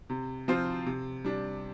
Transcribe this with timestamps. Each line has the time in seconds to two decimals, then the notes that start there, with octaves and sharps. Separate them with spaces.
0.10 C3
0.48 F3 C4 F4 C5
0.86 C3
1.25 G3 D4